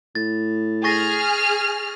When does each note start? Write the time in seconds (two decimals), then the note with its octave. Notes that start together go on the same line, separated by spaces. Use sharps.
0.15 A2 A6
0.84 G#4 C#6 F6 A6 A#6